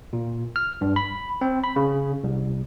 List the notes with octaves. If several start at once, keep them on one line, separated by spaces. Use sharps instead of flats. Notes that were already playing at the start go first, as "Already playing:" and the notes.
A#2
F6
G2
B5
C4
B5
C#3
C2